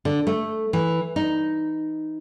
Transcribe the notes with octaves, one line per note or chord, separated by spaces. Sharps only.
D3
A3
E3
D#4